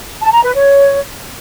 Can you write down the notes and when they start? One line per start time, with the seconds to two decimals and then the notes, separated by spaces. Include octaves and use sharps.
0.21 A5
0.32 A#5
0.43 B4
0.54 C#5